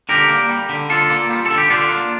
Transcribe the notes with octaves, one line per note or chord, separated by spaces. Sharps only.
D3 G4 A#4
A#3
G3
D3
D3 F4 A4
A#3
G3
D3 A4
G4
D3 D4 F4
A#3